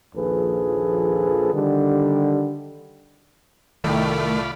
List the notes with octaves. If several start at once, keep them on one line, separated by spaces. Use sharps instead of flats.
A#1 D#2 F3 G#4 A4 B4
D3 D#3 G3
C2 A2 D#3 A3 F4 D5 G5 B5